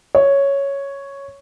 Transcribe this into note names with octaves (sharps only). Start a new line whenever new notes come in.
C#5